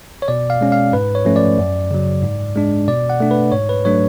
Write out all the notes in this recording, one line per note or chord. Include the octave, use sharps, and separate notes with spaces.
C#5
B2 D5
F5
G#3 C#4
F5
G#2 B4
C#5
F3 A3 C#4
D5
F#2
C#3 F#3
G#2
G#3 D4
B2 D5
F#5
A3 D4
B4
G#2 C#5
B4
F#3 A3 D4 C#5